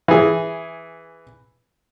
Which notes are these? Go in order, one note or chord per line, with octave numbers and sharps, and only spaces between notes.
E3 G#4